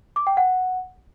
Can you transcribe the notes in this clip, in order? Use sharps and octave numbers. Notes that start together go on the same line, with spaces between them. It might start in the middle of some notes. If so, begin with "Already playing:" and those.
D6
G5
F#5